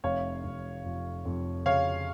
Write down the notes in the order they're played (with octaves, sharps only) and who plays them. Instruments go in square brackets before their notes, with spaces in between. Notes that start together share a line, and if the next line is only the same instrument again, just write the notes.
[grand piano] F1 C#5 F5
F1
F2
F2
C#3 C#5 F5